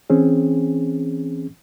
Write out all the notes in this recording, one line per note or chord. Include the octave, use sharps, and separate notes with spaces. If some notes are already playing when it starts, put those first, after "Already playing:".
E3 C4 C#4 G#4